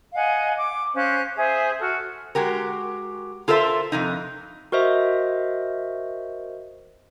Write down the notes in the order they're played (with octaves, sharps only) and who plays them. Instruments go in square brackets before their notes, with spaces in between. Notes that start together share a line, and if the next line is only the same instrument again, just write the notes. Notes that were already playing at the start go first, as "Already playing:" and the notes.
[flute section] D#5 F5 F#5 G#5
D6
C#4 C5 F5 F#6
G#4 C5 E5
F#4 A4 F6
[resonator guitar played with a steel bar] G#3 F#4 G4 A#4
F4 A4 A#4 C5 E5
F2 C3 D#4
[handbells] F#4 A#4 C5 D#5 E5